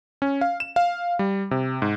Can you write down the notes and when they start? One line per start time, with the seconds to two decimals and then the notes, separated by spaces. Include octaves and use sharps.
0.22 C#4
0.41 F5
0.60 E7
0.76 F5
1.19 G3
1.51 C3
1.82 G#2